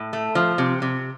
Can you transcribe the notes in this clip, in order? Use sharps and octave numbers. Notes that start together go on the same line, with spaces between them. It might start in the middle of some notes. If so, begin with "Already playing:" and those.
Already playing: A2
A3
F3
C3
C3